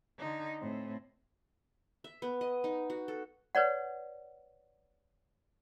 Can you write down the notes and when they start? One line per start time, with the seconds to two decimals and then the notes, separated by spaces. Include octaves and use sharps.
0.18 D3 D#4
0.60 A2 C4
2.04 E5
2.22 B3
2.41 D#5
2.64 D#4
2.90 F#4
3.08 A4
3.55 B4 C#5 D5 F#5